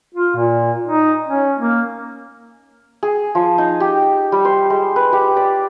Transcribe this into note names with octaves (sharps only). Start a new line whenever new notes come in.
F4
A#2
D#4
C#4
A#3
G#4
F3
D#4
G4
G3
C5
G#3
B4
G4
D5